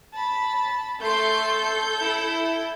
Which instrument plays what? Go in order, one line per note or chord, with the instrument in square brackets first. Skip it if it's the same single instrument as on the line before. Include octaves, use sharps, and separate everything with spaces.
[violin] A5 B5
[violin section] A3 C6 [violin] A4 G6
[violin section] E4